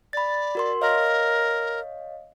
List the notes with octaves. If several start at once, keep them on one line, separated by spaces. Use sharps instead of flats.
D5 B5 A6
F#4 A#4 C6
A#4 C#5 D#5 F5